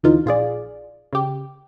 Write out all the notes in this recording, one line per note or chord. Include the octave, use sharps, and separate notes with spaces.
D#2 D3 E3 D#4 F4
A#1 F4 G#4 D5
C#3 G4